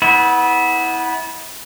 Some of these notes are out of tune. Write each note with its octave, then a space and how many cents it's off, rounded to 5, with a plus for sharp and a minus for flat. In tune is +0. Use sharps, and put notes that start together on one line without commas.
B3 +0 E4 -30